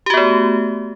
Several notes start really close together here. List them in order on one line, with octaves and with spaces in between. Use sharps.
G4 F#4 B3 A3